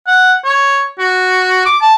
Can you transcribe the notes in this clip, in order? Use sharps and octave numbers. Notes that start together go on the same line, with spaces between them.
F#5
C#5
F#4
D6
A5